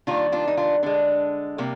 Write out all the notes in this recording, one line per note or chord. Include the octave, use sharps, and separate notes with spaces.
D#3 G3 A#3 D4 F4
D4 F4
D#4
D4 F4
D3 G#3 D4
C3 G3 A#3